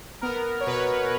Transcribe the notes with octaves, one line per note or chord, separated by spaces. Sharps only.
B3 A#4
C#5
B2 B4